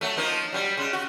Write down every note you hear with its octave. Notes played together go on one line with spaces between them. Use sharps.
F#3 A3
F3 A#3 D#4
F#3 G3
C#3 G#3
F#4